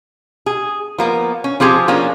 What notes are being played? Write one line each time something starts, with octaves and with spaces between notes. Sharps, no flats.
G#4
F3 A#3 B3
C#4
F3 C4 G4 G#4 A5
F3 A#3 C#4 D4